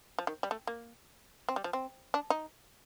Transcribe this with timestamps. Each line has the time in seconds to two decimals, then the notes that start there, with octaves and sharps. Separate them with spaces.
0.19 F3
0.27 D#3
0.43 G3
0.51 A3
0.67 A#3
1.49 C4
1.56 G3
1.64 F3
1.73 C4
2.14 D4
2.30 D#4